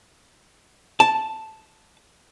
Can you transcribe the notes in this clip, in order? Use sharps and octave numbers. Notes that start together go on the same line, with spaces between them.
A5